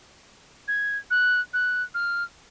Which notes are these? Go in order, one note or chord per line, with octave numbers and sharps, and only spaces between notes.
G#6
F#6
F#6
F6